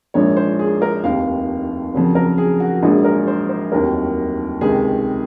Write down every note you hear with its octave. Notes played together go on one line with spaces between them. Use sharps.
A#1 G#2 F3 A#3 C#5
C5
G#4
A#4
F1 D#2 D#3 F5
F2 C#3 F#3 A#3
A#4
G#4
F#4
A#1 G#2 F#3 A#3 G#4
A#4
C5
C5
F1 D#2 D#3 F#3 A#3 A#4
C#2 C3 D#3 G#4